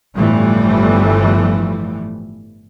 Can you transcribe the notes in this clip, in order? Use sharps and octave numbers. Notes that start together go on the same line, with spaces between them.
G1 A2 E3 F3 G3 A3